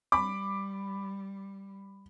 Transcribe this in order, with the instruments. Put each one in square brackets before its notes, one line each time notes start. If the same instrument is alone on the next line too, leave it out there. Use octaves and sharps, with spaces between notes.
[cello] G3 [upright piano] B5 D6